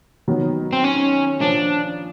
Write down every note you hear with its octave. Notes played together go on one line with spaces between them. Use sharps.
D#3 F#3 B3
C4
C#4
A#2 F3 A#3 C#4 D4